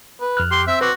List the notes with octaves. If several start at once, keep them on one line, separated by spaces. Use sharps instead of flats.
B4
F2 F6 F#6
G4 C6
C4 E5
F#4 B4 C6 D6